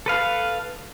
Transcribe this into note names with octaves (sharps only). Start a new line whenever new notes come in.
A4 B4 F5